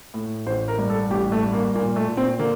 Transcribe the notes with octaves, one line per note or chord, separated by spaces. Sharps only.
A2
A1 C5
A#4
G2
A4
A1 G4
A3
G2
A#3
A#2 A#3
A3
A#2
C4
D3 A#3